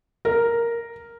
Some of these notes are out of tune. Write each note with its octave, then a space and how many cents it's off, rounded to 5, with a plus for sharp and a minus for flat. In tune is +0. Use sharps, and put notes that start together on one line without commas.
A#4 +0